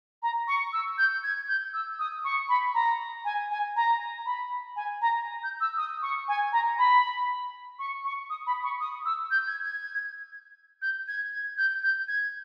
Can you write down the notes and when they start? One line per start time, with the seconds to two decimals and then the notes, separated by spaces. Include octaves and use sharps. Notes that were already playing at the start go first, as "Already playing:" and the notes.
0.23 A#5
0.48 C#6
0.73 E6
0.98 G6
1.24 G#6
1.48 G6
1.73 E6
1.99 D#6
2.24 C#6
2.49 B5
2.74 A#5
3.25 G#5
3.50 G#5
3.76 A#5
4.26 B5
4.76 G#5
5.01 A#5
5.44 G6
5.61 E6
5.77 D#6
6.02 C#6
6.28 G#5
6.53 A#5
6.78 B5
7.79 C#6
8.05 C#6
8.30 D#6
8.47 B5
8.64 C#6
8.80 D#6
9.05 E6
9.31 G6
9.47 G#6
9.64 G#6
10.82 G6
11.08 G#6
11.32 G#6
11.58 G6
11.83 G6
12.08 G#6